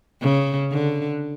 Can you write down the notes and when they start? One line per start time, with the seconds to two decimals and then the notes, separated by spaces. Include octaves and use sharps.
0.21 C#3
0.71 D3